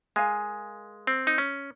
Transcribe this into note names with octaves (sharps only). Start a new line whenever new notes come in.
G#3 A#4 F5 G#5
C4
D#4
C#4